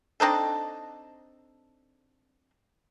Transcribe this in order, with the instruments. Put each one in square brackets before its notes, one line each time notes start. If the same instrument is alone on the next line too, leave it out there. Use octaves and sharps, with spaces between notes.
[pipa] C4 D4 D#4 A4